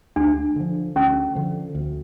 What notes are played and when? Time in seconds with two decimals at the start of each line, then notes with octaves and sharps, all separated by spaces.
0.16 D2 D4
0.56 D3 F3
0.96 D2 C#4
1.35 D3 F3
1.75 D2